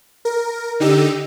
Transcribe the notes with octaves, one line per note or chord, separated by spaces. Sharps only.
A#4
D3 D#4 G4 E6